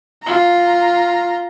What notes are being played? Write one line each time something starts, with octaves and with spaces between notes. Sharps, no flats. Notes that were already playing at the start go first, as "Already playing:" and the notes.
F4 A#5